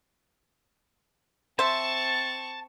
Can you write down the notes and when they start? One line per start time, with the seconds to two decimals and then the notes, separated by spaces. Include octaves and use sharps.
1.59 C4 C5 E5 A5 C#6